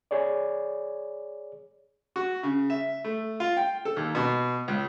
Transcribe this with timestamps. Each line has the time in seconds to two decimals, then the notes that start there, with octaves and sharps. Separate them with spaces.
0.11 G#4 C#5 D5
2.16 F#4
2.43 C#3
2.70 E5
3.04 A3
3.40 F4
3.57 G5
3.85 A4
3.96 D#2
4.15 B2
4.68 C#2